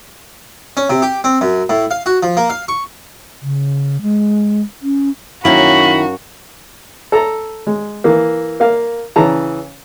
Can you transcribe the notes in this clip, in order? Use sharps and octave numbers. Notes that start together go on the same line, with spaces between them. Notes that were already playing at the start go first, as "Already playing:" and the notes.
C#4
C3
G4
C4
F#2
A2
F5
F#4
F3
A#3
F5
C#6
C#3
G#3
C#4
F#2 D#3 A#3 C#4 E4 F#4 B5
A4 A#5
G#3
E3 A#3
A#3 F5
C#3 E3 A5 A#5